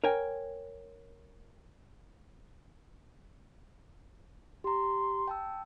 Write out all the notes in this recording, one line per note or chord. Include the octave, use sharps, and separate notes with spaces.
A#4 C#5 G5 G#5
G4 A#5 C6
G5 A5 E6